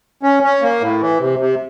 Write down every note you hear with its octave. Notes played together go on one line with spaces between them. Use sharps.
C#4
C#4
A#3
A2
E3
C3
C3